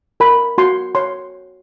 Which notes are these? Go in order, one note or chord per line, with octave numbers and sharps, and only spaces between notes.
A#4 B5
F#4 C6
C#5 C6